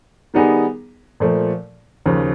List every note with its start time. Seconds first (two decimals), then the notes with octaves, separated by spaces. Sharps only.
0.34 D#3 G3 B3 D#4 G#4
1.20 A#2 F3 A3
2.06 D#2 C#3 F3